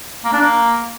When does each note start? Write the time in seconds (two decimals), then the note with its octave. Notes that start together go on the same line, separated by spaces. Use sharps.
0.25 A#3
0.33 D4
0.41 A#3